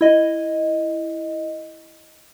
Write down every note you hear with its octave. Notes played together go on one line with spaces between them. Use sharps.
E4 D#5